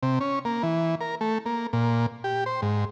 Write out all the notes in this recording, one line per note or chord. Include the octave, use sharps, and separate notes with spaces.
C3
C#4
A#3
E3
A#4
A3
A#3
A#2
G4
C5
G#2